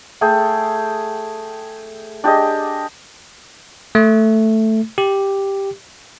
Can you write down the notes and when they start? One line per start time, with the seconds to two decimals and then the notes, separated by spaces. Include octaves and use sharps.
0.21 A3 G#4 G5
2.24 D4 G4 G#4 D#5
3.95 A3
4.98 G4